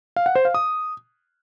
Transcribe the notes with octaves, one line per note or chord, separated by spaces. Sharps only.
F5
F#5
C5
F5
D#6